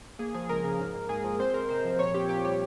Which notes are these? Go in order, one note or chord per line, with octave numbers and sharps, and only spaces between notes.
A#3 G#4
F3 G#4
C#2 A#4
C#3
G#2
A#3
G#2 G#4
F3
C4 C5
G#3 A#4
C3 C5
F3
A#2 C#5
C4 G4
A#2 G4
G3 G4